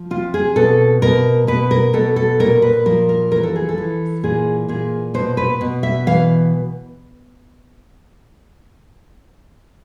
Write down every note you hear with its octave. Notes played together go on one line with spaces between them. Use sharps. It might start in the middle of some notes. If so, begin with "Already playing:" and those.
Already playing: F3
C3 F4
G#4
B2 A4
B2 A#4
B2 B4
A#4
B2 A4
A4
A#2 A#4
B4
F3 A#4
A#4
E3 A#4
A4
G#4
A4
E3
A#2 G#4
A#2 G#4
B2 C5
B4
B2
E5
E3 F5